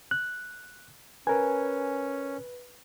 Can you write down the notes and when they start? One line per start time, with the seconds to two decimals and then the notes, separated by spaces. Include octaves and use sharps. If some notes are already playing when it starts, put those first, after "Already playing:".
0.11 F#6
1.27 C#4 A#4 B4 G#5